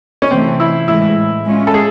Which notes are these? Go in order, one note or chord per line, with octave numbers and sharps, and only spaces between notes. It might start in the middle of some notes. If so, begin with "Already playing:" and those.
C#4
C3 E3 A3 C4
E4
A2 E3 G#3 E4
G#3 C#4 F4
A4
G#4